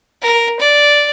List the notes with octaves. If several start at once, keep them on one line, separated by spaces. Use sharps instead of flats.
A#4
D5